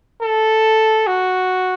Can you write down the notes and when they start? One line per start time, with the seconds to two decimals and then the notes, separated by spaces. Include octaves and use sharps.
0.22 A4
1.07 F#4